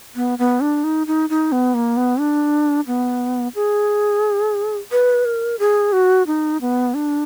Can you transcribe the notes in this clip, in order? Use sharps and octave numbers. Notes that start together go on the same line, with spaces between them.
B3
B3
D4
D#4
D#4
D#4
B3
A#3
B3
D4
B3
G#4
B4
A#4
G#4
F#4
D#4
B3
D4